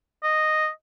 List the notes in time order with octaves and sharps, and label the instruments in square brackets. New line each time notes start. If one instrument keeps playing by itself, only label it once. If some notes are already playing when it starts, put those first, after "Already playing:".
[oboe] D#5